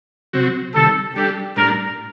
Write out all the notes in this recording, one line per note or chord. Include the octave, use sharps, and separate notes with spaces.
C3 F#3 C4 F#4
C3 D#3 G3 A4
G3 D4 G4 A4
A2 G3 D4 A#4